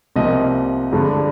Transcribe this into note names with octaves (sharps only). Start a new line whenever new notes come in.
C2 C3 F3 A#3 D#5
G2 D3 F3 G#3